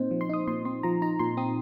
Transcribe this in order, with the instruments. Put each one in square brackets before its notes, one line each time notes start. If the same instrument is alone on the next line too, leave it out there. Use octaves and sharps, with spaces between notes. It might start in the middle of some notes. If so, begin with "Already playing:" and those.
Already playing: [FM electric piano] A#2 C4 D#4 C5
F3
C6
D#4 D#6
A#2 C6
C4 C6
F3 A#5
D#4 A#5
A#2 C6
C4 D#6